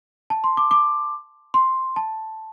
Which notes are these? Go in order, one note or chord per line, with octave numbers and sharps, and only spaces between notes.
A5
C6
D6
D6
C6
A5